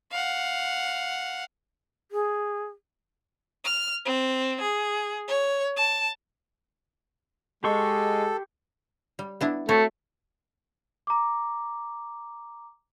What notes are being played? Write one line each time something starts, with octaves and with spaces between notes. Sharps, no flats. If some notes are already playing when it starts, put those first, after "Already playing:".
F5 F#5
G#4
F6
C4
G#4
C#5
A5
G#3 G4 A4 C6 C#6
G3
B3 D4 E4
A3 C4 F#4 C#5
A#5 D6